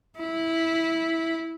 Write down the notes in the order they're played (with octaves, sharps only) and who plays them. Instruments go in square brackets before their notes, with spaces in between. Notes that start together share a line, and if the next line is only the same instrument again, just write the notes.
[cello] E4